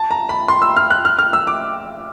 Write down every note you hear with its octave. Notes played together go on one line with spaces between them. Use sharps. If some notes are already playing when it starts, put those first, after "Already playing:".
Already playing: A5
A#5
B5
C6
E6
F6
F#6
F6
F6
E6
D6